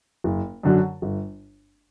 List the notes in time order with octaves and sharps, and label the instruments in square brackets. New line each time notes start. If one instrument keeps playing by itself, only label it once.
[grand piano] F#1
F#2 D3 F#3
G1